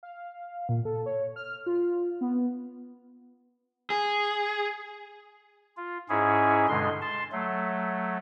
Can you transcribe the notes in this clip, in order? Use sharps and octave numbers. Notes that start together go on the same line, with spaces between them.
F5
A#2
A4
C#5
F6
F4
B3
G#4
F4
G#2 C#4 E4 G#4
G2 B2 D3 G#3 C6
A5 C6
F#3 A3